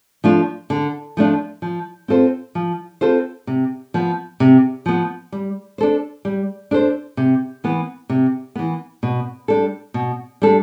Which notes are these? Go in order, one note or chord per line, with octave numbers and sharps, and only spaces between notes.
F3 A3 D4 F4
D3
F3 A3 D4 F4
F3
C4 F4 A4 C5
F3
C4 F4 A4 C5
C3
F3 B3
C3
F3 B3
G3
D4 A4 C5
G3
D4 A4 C5
C3
E3 B3
C3
E3 B3
B2
G3 D4 A4
B2
G3 D4 A4